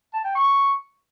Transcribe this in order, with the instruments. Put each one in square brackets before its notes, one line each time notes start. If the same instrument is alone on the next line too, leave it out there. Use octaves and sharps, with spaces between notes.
[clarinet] A5
G5
C#6